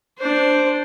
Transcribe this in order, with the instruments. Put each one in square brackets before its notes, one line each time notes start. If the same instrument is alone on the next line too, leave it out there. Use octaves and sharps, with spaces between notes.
[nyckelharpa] D4 C5